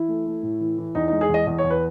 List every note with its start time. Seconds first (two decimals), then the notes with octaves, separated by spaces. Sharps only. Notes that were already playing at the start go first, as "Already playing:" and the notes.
Already playing: E3 E4
0.08 A3
0.26 A3
0.43 A2
0.61 E3
0.78 E3
0.95 E2 D#4
1.08 G#3 D#4
1.21 G#4
1.29 E2 D#5
1.47 E2 D#5
1.58 C#5
1.64 E2
1.70 B4